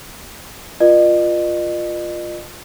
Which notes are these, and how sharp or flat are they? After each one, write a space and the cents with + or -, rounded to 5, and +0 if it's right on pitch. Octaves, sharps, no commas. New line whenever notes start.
F4 +0 A#4 +45 D#5 -40